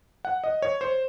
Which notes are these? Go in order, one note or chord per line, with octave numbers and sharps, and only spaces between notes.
F#5
D#5
C#5
C5